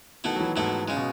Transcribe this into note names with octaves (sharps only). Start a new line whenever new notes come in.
B2 D#3 A3 E4
F#3
E3
G#2 B2 A3 E4
C#3 G#3
B2